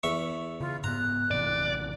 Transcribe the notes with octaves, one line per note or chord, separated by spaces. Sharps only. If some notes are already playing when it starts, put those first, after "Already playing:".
E2 E5 C#6
C#3 F4
G#2 B3 A#5 F#6
A1 C3 E3 D5